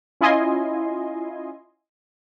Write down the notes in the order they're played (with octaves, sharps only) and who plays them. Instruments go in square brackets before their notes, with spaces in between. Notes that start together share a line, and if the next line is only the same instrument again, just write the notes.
[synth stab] C#4 E4 F4 D#5 G#5 C6